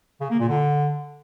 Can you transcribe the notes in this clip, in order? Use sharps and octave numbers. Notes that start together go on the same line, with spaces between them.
C#3
A#3
A#2
D3